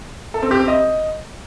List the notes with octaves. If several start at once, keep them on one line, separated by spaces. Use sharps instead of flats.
A4
C4
G4
C4
D#5